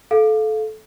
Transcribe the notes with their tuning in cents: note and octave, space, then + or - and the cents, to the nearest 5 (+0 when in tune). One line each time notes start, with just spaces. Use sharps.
A4 -20 F5 +0